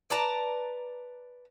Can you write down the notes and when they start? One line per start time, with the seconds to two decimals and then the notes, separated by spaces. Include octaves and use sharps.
0.10 B4 D5 A5 A#5